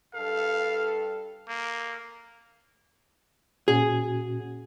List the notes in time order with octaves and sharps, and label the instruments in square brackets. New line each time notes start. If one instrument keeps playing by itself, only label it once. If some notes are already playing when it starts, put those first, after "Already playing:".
[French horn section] G2 A4 [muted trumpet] F5
[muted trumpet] A#3
[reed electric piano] A#2 C#4 F#4 [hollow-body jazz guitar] G#4